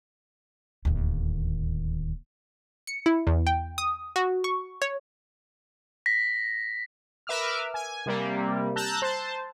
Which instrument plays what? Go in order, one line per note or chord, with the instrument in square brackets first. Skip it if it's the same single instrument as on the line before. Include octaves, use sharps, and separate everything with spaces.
[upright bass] D1 D#2
[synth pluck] C#7
E4
E2
G5
D#6
F#4
C#6
C#5
[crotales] A#6 B6
[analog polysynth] A#4 B4 E5 D6 E6 F6
G#5
C3 G3 A#3
A5 A#5 E6 F#6 G6
C5 A5